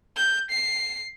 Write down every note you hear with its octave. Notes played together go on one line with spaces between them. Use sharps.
G6
C7